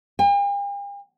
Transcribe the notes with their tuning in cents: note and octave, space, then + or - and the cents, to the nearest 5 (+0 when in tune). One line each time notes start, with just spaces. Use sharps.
G5 +45